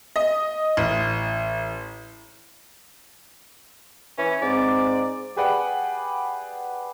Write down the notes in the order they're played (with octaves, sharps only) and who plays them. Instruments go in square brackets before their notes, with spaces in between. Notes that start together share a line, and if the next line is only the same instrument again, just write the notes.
[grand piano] D#5
A1
[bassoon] E3 [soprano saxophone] C#4
[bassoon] G#2 [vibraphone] C4 [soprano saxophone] D5
[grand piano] G4 G#4 B4 D5 F#5 G5